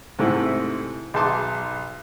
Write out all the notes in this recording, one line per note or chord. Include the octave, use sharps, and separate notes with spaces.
G#2 C3 A3 E4
B1 G#4 E5 A5 C6 D6